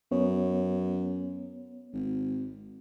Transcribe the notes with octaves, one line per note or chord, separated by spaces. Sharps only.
F#2 B3 C#5
G#1